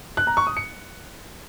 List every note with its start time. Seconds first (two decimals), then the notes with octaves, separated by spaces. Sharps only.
0.17 F#6
0.27 A#5
0.37 C#6
0.47 D#6
0.57 C#7